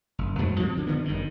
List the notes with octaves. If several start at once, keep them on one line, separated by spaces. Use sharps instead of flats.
F#1
F2 G#2 F3 F#3
F3 G3 C4
D2 D3
D3 F3 B3
G1 F#2 D#3